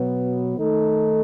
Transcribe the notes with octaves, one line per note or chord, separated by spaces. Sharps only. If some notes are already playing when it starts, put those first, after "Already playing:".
Already playing: B2 F#3 B3
D#3 A3 D#4 A4